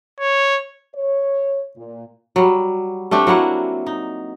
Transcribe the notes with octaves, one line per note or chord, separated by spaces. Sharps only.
C#5
C#5
A#2
F#3 G3
A3 C4 D4 G4
F#3 A#3 E4 F#5
D#4